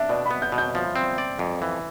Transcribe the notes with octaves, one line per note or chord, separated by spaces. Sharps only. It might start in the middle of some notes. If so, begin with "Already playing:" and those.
Already playing: D4 E5
B2 D5
B5
B3
G6
B2
G6
F3
C4
D5
F2
E3